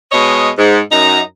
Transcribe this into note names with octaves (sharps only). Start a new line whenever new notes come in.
B2 G#3 C#5 D#5
G#2
F#2 D#4 A#5